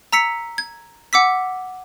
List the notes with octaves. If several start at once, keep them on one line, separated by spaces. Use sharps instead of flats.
A#5 E6 B6 C#7
G#6
F#5 D6 E6 B6